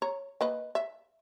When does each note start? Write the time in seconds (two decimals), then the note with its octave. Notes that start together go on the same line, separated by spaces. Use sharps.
0.02 C#5 A#5
0.41 A#3 B4 D#5
0.75 E5